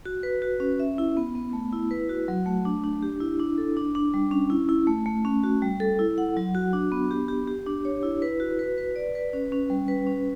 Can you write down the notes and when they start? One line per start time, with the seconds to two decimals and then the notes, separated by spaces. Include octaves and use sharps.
0.05 F#4
0.23 B4
0.42 F#4
0.60 C#4
0.80 E5
0.98 E4
1.17 B3
1.35 B3
1.53 A3
1.73 E4
1.91 B4
2.09 F#4
2.28 F#3
2.46 A3
2.65 D4
2.84 D4
3.03 G4
3.20 E4
3.40 D4
3.58 A4
3.77 D4
3.95 D4
4.14 G3
4.31 C#4
4.50 E4
4.69 E4
4.87 A3
5.06 A3
5.25 C#4
5.44 F#4
5.62 G3
5.80 A4
5.99 E4
6.18 F#5
6.37 F#3
6.55 F#4
6.73 D4
6.92 B3
7.11 G4
7.28 G4
7.48 G4
7.66 D4
7.85 C#5
8.03 E4
8.22 B4
8.40 F#4
8.59 B4
8.78 B4
8.96 D5
9.15 B4
9.33 C#4
9.52 C#4
9.70 G3
9.88 B4
10.07 C#4